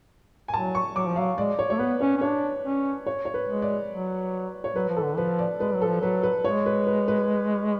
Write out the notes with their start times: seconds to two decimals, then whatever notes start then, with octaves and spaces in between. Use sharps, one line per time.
0.48 G#5
0.53 F#3 A5
0.75 C#6
0.96 F#3 D6
1.08 F3
1.16 F#3 F5
1.38 G#3 D5
1.59 C#5
1.70 A3 C#5
1.79 B3 B4
2.01 C#4 C#5
2.17 C#4
2.21 D4 C#5
2.64 C#4
3.06 C#5
3.25 C#5
3.34 B4
3.48 G#3
3.62 D5
3.91 F#3
4.64 C#5
4.75 F#3 B4
4.89 F3
4.97 A4
5.03 D3
5.17 F3 B4
5.39 D5
5.59 G#3 B4
5.74 F#3
5.82 A4
5.87 F3
6.01 F#3 B4
6.23 B4
6.44 G#3 C#5
6.66 B4
6.87 B4
7.08 B4